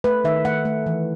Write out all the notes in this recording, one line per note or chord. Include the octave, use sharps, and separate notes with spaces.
A3 B4
D#3 E5
A3 F#5
A3
E3